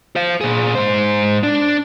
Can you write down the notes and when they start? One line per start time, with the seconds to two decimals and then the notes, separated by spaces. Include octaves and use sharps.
0.16 C5 F5
0.41 A#2 G#4
0.75 G#2 C5
1.43 D4